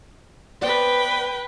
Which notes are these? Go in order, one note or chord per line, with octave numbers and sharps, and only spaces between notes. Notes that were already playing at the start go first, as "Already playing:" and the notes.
B3 B4 C5 D5 G5